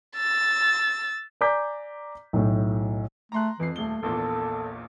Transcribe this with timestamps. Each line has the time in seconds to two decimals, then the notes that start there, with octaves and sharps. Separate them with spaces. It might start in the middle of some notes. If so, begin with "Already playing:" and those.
0.16 E6 A6
1.41 D5 G#5 A#5 D6 G6 B6
2.33 B1 A2
3.32 A3 A#5 C6 F#6
3.60 F2 E3 C7
3.76 D#1 A3 G7
4.03 A#1 E2 A#2 A4